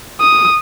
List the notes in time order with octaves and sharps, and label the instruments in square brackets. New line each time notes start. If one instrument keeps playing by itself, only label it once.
[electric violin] D#6